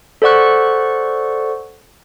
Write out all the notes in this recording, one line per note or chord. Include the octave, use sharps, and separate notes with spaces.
A4 C5 D5 F#5 C#6 F#6